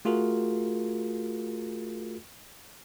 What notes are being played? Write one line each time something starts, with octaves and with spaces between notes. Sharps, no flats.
A3 F4 F#4 G#4 A#4